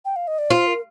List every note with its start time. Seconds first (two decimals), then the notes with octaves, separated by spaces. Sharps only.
0.05 G5
0.16 F5
0.28 D#5
0.39 D5
0.50 F4 C5
0.67 A#4